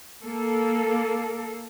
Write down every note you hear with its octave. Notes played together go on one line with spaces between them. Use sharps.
A#3 A4